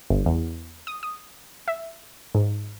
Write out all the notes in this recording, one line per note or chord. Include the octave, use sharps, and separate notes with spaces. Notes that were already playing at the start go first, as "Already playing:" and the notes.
G1
E2
D#6
D#6
E5
G#2